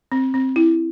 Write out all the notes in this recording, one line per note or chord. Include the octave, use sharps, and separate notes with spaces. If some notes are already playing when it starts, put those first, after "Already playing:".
C4
C4
E4